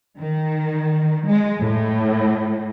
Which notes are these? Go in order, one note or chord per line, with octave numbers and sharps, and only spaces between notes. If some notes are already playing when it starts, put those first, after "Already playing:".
D#3
G#3
A2